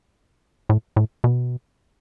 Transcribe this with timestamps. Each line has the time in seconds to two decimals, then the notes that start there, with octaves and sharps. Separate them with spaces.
0.69 A2
0.96 A2
1.24 B2